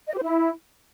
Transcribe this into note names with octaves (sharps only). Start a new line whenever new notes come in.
D#5
G4
C5
E4